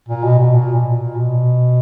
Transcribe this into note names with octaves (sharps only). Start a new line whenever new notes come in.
A#2
B2
B2
A#2
B2
A#2
B2